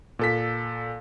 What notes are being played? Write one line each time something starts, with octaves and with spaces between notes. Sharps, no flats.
A#2 A4 B6